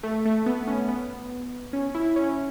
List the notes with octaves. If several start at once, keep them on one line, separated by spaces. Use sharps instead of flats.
A3
A3
B3
C#4
B3
C#4
E4
C#4